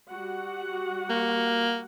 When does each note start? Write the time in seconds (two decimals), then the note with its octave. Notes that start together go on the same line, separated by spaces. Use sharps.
0.10 G3 F#4 F#5
1.10 A#3